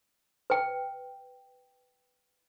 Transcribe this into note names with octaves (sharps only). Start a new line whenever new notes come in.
B4 G5